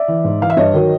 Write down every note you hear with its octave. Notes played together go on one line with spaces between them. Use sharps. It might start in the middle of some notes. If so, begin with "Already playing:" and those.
Already playing: D5 E5
E3
G#2
E3 F5
E5
G2 C#5 D#5
D#3 F#3